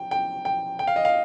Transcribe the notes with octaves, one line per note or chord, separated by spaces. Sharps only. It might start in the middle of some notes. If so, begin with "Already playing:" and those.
Already playing: G5
G5
G5
G5
F5
D#5
F5